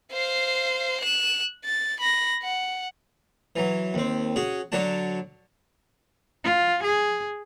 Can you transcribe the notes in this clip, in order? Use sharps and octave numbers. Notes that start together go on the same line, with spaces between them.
C5 F5
F#6 E7
A6
B5 A#6
F#5
E3 F#3
D#2 C4
C#4 F#4 G#4
D3 F#3 D4 F#4 A5
F4
G#4